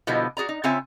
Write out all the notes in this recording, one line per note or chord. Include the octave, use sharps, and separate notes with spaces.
B2 D3 F3 G3 E4 D#5
F#4 G#4 D5 A#5
D#4
C#3 C4 F4 C#5 E5 G#5